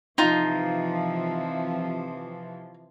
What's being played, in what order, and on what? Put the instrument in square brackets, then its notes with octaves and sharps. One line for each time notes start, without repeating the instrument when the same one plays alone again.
[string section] C3 E3 F3 [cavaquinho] D#4 F4